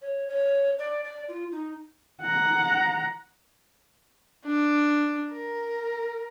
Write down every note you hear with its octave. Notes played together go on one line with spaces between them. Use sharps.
C#5
C#5
D5
D5
F4
D#4
F#5 A#5
D4
A#4